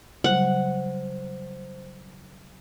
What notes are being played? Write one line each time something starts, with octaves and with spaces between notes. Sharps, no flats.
C#3 F#3 G3 C5 F#5